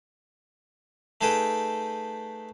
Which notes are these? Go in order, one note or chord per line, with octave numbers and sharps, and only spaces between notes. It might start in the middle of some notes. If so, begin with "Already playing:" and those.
A3 D#4 G#4 A4 B4 G5